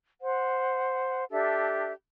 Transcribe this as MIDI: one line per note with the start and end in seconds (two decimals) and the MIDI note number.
0.21 1.25 72
0.21 1.25 78
1.31 1.92 62
1.31 1.92 67
1.31 1.92 69
1.31 1.92 76